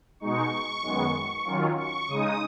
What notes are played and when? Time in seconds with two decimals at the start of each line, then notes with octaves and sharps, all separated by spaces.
0.20 B2 G#3 D#4 C#6
0.82 F#2 D#3 G#3 B3
1.45 D#3 F#3 C#4 F4
1.76 C#6
2.08 C#3 G#3 D#4 D#6